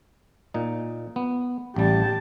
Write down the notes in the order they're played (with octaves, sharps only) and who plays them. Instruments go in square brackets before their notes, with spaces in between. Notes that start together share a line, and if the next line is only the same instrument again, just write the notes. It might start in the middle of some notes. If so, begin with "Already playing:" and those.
[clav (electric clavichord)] A#2 D#4
B3
[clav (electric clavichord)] A1 G3 [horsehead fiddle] G4 A5